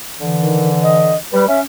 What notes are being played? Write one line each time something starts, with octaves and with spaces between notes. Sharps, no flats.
D3 E3
D#3
D#5
G3 B4
C#4 E5